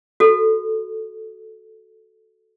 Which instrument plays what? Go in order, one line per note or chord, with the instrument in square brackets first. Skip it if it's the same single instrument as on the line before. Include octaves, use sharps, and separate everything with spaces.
[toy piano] F#4 A4